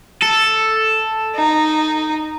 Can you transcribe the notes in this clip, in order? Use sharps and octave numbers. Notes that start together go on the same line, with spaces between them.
A4
D#4